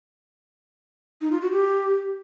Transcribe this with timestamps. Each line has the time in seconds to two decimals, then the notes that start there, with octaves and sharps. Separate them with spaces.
1.21 D#4
1.31 F4
1.42 F#4
1.52 G4